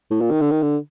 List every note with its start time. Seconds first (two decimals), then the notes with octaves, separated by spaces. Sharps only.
0.11 A2
0.21 A#2
0.31 D#3
0.41 D3
0.51 D#3
0.62 D3